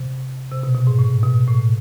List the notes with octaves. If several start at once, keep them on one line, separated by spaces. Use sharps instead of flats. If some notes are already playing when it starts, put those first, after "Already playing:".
Already playing: C3
C3
B2
B2
G#2
A2
B2
A2